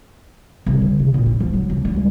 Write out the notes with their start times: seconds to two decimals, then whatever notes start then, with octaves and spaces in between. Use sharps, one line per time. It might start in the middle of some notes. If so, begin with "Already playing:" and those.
0.66 C2
0.82 D3
1.00 C3
1.14 A#2
1.26 D#4
1.40 F3
1.54 F#3
1.70 C2
1.85 G3
1.96 C#2